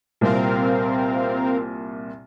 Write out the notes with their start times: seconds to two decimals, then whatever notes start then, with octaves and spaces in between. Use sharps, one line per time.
0.21 C2 A#2 C4 A#4 F5